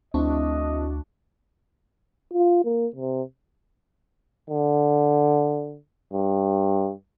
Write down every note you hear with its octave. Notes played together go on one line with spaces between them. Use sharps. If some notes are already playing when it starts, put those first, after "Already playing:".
D2 A3 C4 D4 E4 F#4 D#5
F4
A#3
C3
D3
G2